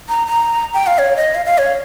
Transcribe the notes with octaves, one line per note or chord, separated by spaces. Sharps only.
A#5
A#5
G5
F5
C#5
D#5
F5
F5
C#5